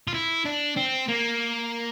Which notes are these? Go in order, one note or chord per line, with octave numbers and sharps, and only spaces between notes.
F4
E4
D4
C4
A#3